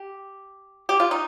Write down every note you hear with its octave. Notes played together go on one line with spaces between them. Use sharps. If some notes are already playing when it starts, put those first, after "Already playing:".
Already playing: G4
G4
F4
D#4